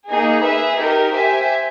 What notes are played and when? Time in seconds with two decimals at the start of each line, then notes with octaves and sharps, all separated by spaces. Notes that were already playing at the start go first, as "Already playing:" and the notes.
0.09 A#3 D#4 G#4
0.43 G#4 B4 E5
0.77 D#4 G4 A#4
1.11 G4 C5 E5 G#5